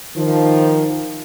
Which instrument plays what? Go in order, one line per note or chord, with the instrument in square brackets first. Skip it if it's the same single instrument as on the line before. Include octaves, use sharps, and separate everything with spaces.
[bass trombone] D#3 [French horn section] F3